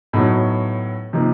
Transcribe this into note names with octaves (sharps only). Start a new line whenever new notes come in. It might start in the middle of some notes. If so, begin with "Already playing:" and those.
A2 F#3 B3 D#4 F#4
C3 F3 A#3 D#4